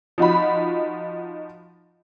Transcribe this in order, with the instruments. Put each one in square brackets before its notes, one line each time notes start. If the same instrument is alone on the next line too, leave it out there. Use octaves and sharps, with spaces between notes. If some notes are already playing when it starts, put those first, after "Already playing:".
[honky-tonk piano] F3 D#4 F#4 B5